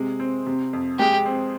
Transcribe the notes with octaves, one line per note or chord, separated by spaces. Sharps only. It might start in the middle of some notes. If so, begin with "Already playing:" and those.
Already playing: C3 G#3
C4
C3
F2
G#3 G4
C4